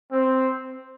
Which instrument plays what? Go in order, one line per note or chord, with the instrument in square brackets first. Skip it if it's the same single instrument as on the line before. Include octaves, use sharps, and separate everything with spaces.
[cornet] C4